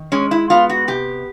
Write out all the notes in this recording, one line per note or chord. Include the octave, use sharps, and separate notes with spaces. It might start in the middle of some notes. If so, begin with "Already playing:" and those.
Already playing: D#3
G#3 C#4
E4
B3 F4
F#4
C3 G4